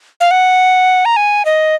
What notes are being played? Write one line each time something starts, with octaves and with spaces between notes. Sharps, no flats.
F5
F#5
A#5
G#5
D#5